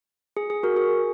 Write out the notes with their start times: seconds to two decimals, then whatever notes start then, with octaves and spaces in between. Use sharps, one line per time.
0.37 G#4
0.50 G#4
0.63 F#4 A#4
0.77 G#4